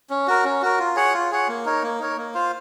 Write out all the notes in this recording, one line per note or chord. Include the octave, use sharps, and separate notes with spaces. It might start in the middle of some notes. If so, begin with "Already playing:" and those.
C#4
F#4 A#4
C#4
F#4 A#4
F4
G#4 C#5 F#5
F4
G#4 C#5 F#5
A#3
D#4 A#4 C#5
A#3
D#4 A#4 C#5
A#3
F4 C5 F5